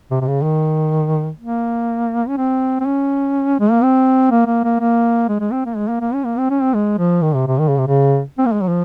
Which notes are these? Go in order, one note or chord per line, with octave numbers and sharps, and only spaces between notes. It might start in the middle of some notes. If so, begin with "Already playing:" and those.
C3
C3
C#3
D#3
A#3
C#4
C4
C4
C#4
G#3
A#3
C4
A#3
A#3
A#3
A#3
G#3
G#3
C4
A#3
G#3
A#3
A#3
C#4
A#3
C4
C#4
C4
G#3
F3
D#3
C3
C3
D#3
C#3
C3
C#3
C4
A#3
G#3
F#3
F3